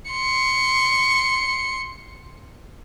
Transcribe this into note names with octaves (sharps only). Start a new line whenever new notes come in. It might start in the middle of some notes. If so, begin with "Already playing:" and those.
C6 C#7